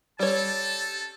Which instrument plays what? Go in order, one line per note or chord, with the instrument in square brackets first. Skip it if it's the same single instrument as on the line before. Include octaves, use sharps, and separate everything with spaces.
[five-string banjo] G3 C#5 [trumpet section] C4 C#4 A4 [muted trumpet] A5